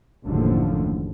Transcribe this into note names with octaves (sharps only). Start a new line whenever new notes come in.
F#1 D#2 A2 D3 F3